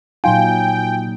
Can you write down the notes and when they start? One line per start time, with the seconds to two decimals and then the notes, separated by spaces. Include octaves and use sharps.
0.24 A#2 F#3 D#4 F4 G5 G#5